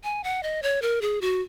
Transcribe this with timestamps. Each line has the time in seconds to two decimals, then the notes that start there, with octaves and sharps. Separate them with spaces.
0.04 G#5
0.24 F#5
0.43 D#5
0.63 C#5
0.82 A#4
1.02 G#4
1.21 F#4